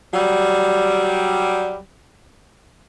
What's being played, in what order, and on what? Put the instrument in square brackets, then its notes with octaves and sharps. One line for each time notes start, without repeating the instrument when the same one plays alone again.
[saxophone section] F#3 G3